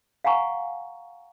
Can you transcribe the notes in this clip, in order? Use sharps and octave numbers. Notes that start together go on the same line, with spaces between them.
F5 F#5 G#5 A#5 C#6